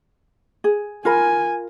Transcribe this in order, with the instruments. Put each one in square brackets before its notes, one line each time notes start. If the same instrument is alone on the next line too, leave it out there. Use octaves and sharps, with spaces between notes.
[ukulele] G#4
[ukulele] F4 A#4 B5 [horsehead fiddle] G#5